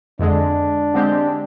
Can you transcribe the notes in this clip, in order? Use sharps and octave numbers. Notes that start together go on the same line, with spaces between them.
F2 D3 G#3 D4
D3 G#3 C4 G4